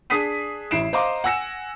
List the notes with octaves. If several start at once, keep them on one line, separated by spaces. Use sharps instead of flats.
D4 G#4 D#6 B6 C7 D#7
A1 E4 C7 D7 E7
C5 D#5 F5 A#5 C6 D6
F#5 G#5 E6 A#6 C#7 E7